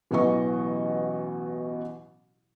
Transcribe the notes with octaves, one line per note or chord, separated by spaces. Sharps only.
A1 B2 E3 F#3 D#5 C#6